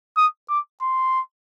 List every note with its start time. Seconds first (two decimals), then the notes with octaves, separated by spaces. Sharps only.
0.17 D#6
0.49 D6
0.82 C6